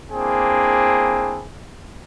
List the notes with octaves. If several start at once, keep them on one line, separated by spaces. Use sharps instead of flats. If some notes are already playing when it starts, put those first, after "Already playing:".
A#3 C4 D4 E4 G#4